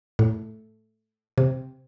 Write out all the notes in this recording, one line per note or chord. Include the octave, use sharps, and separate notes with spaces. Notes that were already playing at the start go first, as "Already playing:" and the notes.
A2
C3